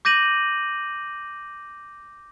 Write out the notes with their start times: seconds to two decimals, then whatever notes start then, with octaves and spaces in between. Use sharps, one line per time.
0.05 D6 G6 A#6 D#7 F#7